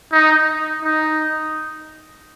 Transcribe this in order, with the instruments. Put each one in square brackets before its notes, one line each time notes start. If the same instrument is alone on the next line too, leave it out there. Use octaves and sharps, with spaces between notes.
[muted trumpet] D#4
D#4